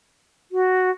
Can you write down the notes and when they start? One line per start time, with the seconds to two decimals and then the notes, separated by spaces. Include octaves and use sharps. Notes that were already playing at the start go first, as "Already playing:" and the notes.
0.52 F#4